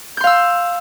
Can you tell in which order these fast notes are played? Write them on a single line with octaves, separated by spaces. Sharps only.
G6 C6 F5 E6